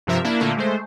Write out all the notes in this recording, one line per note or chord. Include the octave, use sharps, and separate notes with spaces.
G2 C3 F3 A#4 E5
A#3 D4 E4
A#2 D3 A3 A#3
G#3 A3 C5